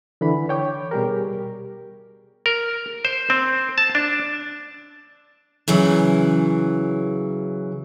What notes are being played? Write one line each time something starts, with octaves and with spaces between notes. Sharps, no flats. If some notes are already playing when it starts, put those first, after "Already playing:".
D3 E3 B5
C#5 G5 C#6 D6
B2 G3 G4 G#4 A#4
A#4
C5
C4
A5
D4
C#3 E3 F#3